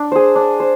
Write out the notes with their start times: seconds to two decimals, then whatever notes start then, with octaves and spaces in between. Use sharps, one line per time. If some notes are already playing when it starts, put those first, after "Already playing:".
Already playing: D4
0.12 G#4 C5
0.35 D4
0.60 C5